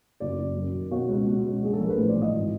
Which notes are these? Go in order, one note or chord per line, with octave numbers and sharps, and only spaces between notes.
F#1 D5
F#1
F#2
D#3
B2 C#5
C#2
B2
C#2
A#1 G#4
A4
A#1 A#4
B4
A2 C5
D5
E3
D#5
G#1